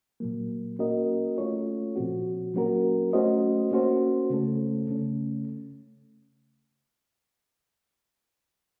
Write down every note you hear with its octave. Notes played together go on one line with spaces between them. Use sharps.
A#2 F#3 A#3
A#3 C#4 F#4 A#4 D#5
A3 C#4 F4 A4 C#5
A#2 F3 C4 F#4
F#3 A#3 C#4 F#4 A#4
A3 C#4 F#4 C5 D#5
A#3 C#4 F#4 C5
C#3 A3 C#4 A4
C#3 A3 C#4